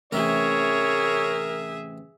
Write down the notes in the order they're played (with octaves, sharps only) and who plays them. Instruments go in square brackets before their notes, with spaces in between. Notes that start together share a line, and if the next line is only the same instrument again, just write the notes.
[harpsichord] A1 C3 D#4 [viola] G#4 E5 [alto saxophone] A#4 [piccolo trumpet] C#5